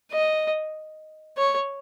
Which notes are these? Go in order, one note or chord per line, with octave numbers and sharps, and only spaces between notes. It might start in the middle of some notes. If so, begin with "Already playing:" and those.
D#5
C#5